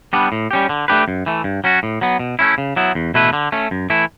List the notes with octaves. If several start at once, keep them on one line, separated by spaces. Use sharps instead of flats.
G3 B3 D4
A2
G3 C#4 G4
D3
A3 D4 G4 B4
F#2
E3 A3
G2
F#3 C#4 F#4
A2
F#3 B3
B2
A3 C#4 E4
C#3
F#3 B3 E4
E2
B2 A3 E4 B4
D3
A3 C#4
F#2
E3 A3 E4